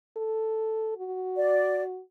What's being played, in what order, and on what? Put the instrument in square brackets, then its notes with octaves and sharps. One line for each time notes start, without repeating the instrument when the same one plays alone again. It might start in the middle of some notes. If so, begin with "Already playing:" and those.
[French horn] A4
F#4
[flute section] D5